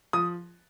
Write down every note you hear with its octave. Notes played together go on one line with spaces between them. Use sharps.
F3 D#6